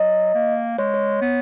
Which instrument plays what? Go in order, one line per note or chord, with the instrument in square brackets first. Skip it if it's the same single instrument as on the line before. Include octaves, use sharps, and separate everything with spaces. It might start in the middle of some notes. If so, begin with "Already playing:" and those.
Already playing: [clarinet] F#3 [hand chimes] D#5
[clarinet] A#3
[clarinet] G#3 [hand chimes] C#5
[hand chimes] C#5
[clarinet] B3